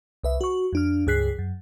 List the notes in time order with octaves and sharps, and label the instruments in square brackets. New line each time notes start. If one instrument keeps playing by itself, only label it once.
[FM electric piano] C2 B4 E5
F#4 C#6
F2 D4 F6
C#2 G2 G#4 F#6 B6 C7
F#2